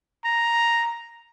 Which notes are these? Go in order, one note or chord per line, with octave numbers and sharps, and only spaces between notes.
A#5